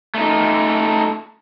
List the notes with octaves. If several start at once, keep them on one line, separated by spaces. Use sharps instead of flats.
A3 D#4